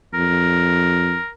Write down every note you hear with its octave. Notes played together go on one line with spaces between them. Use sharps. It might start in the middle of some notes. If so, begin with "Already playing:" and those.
F2 A#4